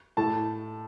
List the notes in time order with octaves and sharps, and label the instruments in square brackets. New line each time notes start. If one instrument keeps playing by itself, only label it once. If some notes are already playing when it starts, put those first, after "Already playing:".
[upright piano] A2 A5